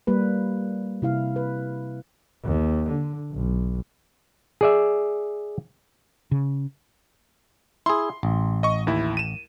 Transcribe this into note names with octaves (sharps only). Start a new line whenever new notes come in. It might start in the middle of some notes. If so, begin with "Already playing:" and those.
G3 A#3 B4
C3 E4 F5
B4
D#2
D3
B1
G#4 D5 E5
C#3
E4 G#4 C6
A1
D#5 C#6
D#2 E4
D#7 E7